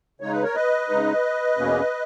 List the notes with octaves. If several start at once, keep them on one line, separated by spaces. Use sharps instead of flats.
C#3 G#3 D#4 C#5
B4
A#4 C#5
B4 D#5
C#3 G#3 D#4
E2 B2 A#3 C#4